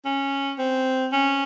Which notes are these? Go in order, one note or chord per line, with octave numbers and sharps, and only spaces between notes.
C#4
C4
C#4